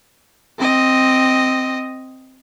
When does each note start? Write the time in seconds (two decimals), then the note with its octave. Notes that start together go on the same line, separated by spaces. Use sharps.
0.59 C4 D#5